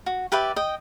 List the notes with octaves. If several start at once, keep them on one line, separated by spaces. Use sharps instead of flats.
F#4
G4 B4 D5 E5
D#5 G5